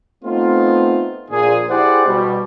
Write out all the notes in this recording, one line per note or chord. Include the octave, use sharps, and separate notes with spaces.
A3 B3 C4 D#4 F4
A#1 A#2 G#4
E4 G4 G#4 C5 D5 F#5
B2 G3